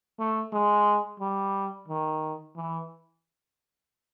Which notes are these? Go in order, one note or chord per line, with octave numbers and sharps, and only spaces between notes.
A3
G#3
G3
D#3
E3